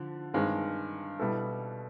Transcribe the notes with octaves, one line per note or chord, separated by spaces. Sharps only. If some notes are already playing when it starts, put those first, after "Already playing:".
Already playing: D3 F3
G2 D#3 G#3 C4
B2 G3 B3 E4 A4